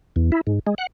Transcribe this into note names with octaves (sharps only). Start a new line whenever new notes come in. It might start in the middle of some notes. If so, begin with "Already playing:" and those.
E2
E4
G#2
G#3
F#5